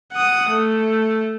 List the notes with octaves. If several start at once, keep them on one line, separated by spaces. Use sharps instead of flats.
F#5 D#6
A3